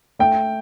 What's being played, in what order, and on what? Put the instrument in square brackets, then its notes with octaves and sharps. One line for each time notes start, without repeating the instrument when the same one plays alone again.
[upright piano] A3 G5